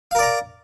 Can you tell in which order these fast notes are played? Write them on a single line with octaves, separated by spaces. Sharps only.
F5 A#4 D5 A#5